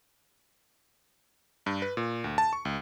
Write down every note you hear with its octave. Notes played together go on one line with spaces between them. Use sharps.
G2
B4
A#2
D2
A5
C#6
C#2